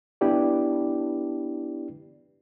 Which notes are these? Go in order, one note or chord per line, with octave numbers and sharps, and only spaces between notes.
B3 D4 E4 G4 B4 D5